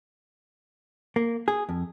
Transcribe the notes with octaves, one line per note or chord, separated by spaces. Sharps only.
A#3
G#4
F2